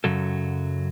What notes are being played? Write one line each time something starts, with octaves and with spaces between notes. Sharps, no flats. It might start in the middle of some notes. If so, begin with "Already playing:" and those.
F#2 C#3 F#3 A4